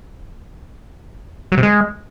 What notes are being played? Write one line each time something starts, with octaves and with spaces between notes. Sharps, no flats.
F#3
C3
G#3